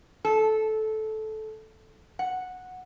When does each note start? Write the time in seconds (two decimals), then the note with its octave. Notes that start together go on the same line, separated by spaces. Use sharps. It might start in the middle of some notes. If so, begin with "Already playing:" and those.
0.25 A4
2.19 F#5